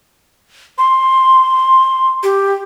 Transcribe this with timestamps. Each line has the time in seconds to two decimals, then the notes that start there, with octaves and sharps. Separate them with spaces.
0.78 C6
2.23 G4